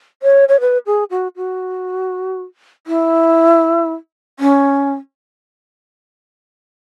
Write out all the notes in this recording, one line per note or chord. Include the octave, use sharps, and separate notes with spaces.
C#5
C#5
B4
G#4
F#4
F#4
E4
C#4